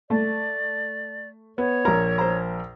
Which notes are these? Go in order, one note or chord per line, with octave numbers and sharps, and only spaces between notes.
A3 D5
B3 C#5
A#1 A#4 A#5
C5 A#5